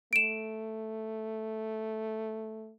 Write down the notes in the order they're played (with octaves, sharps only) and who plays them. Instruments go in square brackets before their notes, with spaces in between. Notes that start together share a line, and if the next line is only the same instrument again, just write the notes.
[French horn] A3 [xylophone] D7 E7